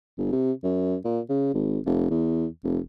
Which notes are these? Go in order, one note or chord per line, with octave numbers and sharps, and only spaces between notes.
G1
C3
F#2
A#2
C#3
G#1
F1
E2
F1